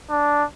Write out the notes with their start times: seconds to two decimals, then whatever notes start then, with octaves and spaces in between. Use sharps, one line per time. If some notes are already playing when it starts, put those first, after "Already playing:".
0.10 D4